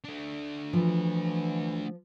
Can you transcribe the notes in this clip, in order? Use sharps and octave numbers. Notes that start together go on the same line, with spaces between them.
A3 D4
E3 F3